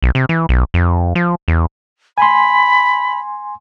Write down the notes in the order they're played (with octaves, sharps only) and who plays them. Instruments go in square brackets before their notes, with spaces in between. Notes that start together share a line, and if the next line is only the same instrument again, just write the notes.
[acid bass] B1
C3
E3
B1
F2
F3
E2
[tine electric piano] G#5 C6 [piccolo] B5